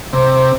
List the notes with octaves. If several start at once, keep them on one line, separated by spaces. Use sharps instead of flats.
C3